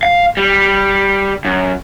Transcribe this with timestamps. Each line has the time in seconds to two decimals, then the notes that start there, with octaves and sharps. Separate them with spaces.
0.03 F5
0.37 G3
1.45 F#2